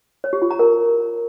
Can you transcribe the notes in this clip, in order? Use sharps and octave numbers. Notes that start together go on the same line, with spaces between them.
C#5
G4
F4
A#5
A#4